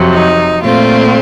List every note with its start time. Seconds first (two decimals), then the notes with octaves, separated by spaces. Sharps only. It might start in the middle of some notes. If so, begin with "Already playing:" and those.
Already playing: F2 C3 F#3
0.14 D#4
0.63 A#2 A3 C4 F4